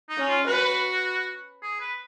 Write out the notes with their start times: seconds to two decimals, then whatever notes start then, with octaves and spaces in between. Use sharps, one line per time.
0.09 D#4
0.18 C#4
0.28 F4
0.47 F#4 B4
1.62 G#4
1.80 B4